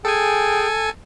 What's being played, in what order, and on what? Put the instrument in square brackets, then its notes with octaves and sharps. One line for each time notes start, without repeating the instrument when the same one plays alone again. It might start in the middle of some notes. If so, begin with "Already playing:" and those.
[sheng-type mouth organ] G#4 G5 [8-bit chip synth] A4 G#5